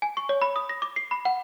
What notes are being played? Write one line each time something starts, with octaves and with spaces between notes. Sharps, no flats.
G#5
C#6
C#5
B5
D#6
A#6
D6
C7
B5
F#5